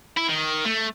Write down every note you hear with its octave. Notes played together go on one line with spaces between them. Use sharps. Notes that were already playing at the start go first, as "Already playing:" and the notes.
E4
D#3
A3